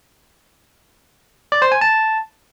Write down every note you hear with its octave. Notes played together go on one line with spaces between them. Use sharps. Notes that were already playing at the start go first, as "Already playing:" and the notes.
D5
C5
G#5
A5